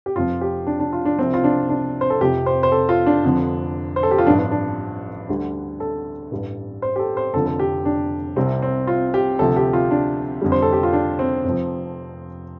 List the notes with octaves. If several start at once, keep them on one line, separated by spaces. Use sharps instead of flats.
G4
F1 F2 F3 F4
G4
D4
D4
F4
D4
C2 C3 F3 C4
F4
D4
D4
C5
A4
F1 F2 C3 F3 G4
C5
C5
A4
F4
D4
F1 F2 D3 F3
C5
A4
G4
F4
A1 G2 F3 D4
D4
D4
D2 D3 G3
A4
A1 G2 G3
C5
G4
A4
C5
F1 F2 D3 F3 A4
A4
G4
D4
C2 C3 G3 C4
C4
F4
G4
D2 C3 F3 A4
G4
F4
D4
F1 F2 D3 G3
C5
A4
G4
F4
D4
C4
F1 F2 F3